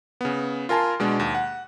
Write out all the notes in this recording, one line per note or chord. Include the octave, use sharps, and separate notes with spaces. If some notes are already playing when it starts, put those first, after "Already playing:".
C#3 B3
F4 A#4 G#5 A5 C6
B2 G#3 D4
D#2
F#5